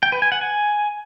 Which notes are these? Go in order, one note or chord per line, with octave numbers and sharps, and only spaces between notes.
G5
B4
G#5
F#5
G#5